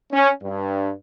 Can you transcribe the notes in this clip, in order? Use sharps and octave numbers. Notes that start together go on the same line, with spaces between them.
C#4
G2